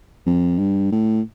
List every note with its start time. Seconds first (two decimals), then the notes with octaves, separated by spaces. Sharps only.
0.26 F2
0.59 G2
0.92 A2